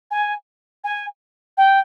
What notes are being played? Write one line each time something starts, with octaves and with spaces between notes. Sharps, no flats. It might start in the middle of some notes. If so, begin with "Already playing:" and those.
G#5
G#5
G5